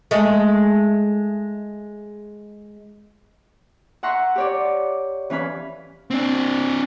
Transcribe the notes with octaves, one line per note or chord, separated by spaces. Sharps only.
G#3 A3
E5 F#5 A#5 C6 C#6
G4 C#5 D5
E3 C#4 F5 B5
C4 D4